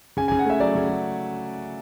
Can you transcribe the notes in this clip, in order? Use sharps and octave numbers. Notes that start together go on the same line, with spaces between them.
C#3 G#5
G#5
C#3
F#5
A3 E5
F#3 D5
C#3
C#3